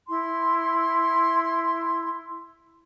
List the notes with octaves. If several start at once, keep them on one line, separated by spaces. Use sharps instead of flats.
E4 C6